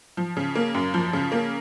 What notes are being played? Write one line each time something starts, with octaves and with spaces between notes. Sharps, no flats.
F3
C#3
A#3
F#2
F3
C#3
A#3